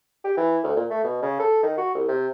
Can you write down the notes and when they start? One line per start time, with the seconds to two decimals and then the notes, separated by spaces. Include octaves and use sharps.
0.24 G4
0.37 E3
0.63 D2
0.76 A#2
0.90 A3
1.04 B2
1.22 C#3
1.39 A4
1.63 D#3
1.78 F#4
1.95 C2
2.08 C3